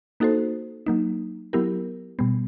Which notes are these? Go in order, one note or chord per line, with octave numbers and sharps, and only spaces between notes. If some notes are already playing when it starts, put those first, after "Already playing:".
A#3 D#4 F#4 A4 C5
F#3 A#3 D#4
F#3 B3 E4 G4 A#4
B2 G3 B3